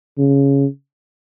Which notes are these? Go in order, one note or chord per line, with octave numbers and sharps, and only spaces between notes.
C#3